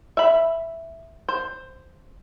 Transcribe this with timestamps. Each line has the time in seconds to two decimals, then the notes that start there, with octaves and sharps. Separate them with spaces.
0.17 E5 B5
1.28 C5